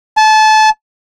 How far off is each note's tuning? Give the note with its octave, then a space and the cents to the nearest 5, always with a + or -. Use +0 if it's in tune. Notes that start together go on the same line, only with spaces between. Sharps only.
A5 -25